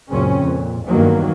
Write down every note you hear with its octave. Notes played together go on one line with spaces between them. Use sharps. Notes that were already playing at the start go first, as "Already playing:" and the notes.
C#2 F#2 A#2 C#3 C4 C#4
F2 A#2
E2 G2 D#3 F#3 A#3